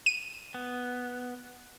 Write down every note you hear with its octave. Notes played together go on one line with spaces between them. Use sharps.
D#7
B3